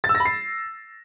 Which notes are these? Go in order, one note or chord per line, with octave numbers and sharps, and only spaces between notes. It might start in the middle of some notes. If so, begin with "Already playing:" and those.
A6
E6
A#6
B5
C7